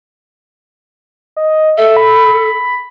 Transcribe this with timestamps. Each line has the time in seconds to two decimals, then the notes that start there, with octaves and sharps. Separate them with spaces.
1.37 D#5
1.77 A4 E5
1.97 B5